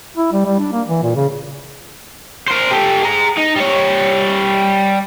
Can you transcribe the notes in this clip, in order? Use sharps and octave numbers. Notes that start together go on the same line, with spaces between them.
E4
G3
G3
D4
A#3
E3
A#2
C#3
A#4 C5
G4 A4
G#4 A#5
D#4
G3 C#5